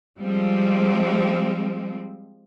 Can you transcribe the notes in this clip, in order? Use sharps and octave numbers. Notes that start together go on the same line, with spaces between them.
F3 G3 G#3 C4